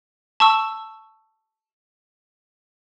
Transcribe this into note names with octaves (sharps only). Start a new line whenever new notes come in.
A5 C#6 E6